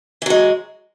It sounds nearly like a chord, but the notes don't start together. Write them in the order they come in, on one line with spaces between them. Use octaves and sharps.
E3 F#3 G#3